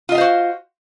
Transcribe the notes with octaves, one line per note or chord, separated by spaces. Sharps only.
F4 F#4 C5 D#5 F5